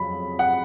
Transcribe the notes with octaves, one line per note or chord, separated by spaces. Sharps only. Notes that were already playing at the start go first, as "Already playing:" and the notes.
Already playing: F2 C#3 F#3 B5
F#5